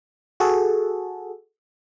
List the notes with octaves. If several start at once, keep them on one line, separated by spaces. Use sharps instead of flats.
F#4 G#4 A4